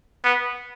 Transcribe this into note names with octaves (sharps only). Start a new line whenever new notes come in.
B3